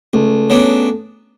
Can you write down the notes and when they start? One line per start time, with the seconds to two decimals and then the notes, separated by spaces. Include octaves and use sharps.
0.13 C#2 A3
0.50 C#3 F#3 B3 D4